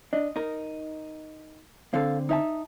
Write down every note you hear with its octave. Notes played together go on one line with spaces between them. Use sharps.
D4 D#5
D#4 A#4
D3 C4 A4 F5
D#4 E5 A5